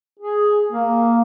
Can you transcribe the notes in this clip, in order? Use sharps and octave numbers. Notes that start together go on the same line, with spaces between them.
G#4
A#3